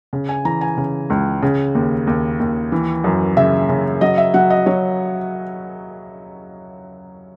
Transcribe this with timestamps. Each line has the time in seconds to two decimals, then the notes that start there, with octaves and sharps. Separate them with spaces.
0.13 C#3
0.29 G#5
0.45 E3 A#5
0.61 G#5
0.77 C#3
1.10 C#2
1.42 C#3
1.75 D#2
2.07 D#2
2.40 D#2
2.72 E3
3.04 F#2
3.37 C#3 E5
3.69 C#3
4.01 F#3 D#5
4.18 E5
4.34 F#3 F#5
4.50 D#5
4.66 F#3 C#5